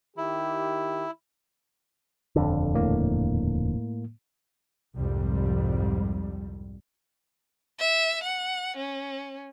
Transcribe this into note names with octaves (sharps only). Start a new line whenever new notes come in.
D#3 E4 G4
D#1 F2 D3
A2 A#3
C2 F2 G#2 G3
E5
F#5
C#4